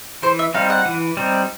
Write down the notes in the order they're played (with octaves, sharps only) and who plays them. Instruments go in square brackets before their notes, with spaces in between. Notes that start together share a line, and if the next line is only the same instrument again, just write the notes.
[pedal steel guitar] E3 [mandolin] C5
[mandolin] E5
[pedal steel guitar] G3 C4 D#4 [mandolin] F5
[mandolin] F#5
[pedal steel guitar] E3
G3 C4 D#4